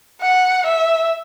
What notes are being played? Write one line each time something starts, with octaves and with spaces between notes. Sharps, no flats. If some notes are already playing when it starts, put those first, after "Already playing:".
F#5
E5